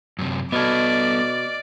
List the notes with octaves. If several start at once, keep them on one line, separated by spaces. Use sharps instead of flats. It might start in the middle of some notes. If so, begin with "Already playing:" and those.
F#2 C3
B2 B3 A4 D5 D#5 F6 G#6